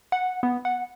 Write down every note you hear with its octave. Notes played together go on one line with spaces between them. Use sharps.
F#5
B3
F#5